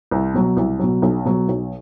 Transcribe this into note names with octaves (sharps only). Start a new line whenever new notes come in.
C2
B2 F#3
C2
B2 F#3
B1
B2 F#3
B1